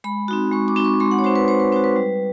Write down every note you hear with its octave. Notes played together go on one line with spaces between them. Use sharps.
G#3 B5
C4 D#4 F#4
G#3 C#6
D6
C4 D#4 F#4
C#6
G#3 C6
F#5
C#5
C4 D#4 F#4 C5
B4
G#3 C5
B4
C4 D#4 F#4 C5
B4
G3